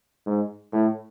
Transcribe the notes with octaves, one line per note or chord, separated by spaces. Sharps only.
G#2
A2